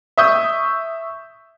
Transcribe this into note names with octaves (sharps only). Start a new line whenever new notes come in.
E5 C#6 D#6 G6